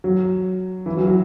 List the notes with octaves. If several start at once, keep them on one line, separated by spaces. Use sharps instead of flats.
F#3
E3
F#3
F#3